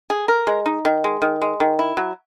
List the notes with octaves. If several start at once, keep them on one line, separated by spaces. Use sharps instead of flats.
G#4
A#4
G#3
D#4
D#3
G#3
D#3
G#3
D#3
E4
F#3